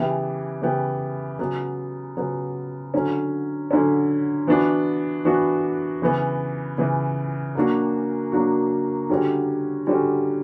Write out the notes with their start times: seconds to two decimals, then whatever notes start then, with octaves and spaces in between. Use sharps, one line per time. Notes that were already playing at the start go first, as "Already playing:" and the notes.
Already playing: C#3 E3 B3 E4 G4
0.62 C#3 E3 B3 E4 G4
1.39 C#3 F#3 B3
2.17 C#3 F#3 B3
2.94 D3 F#3 C#4
3.71 D3 F#3 C#4
4.47 E3 B3 D4 F#4
5.25 E3 B3 D4 F#4
6.02 C#3 E3 B3
6.78 C#3 E3 B3
7.55 F#3 A#3 D4 F#4
8.32 F#3 A#3 D4 F#4
9.10 D3 G3 C#4 F#4
9.87 D3 G3 C#4 F#4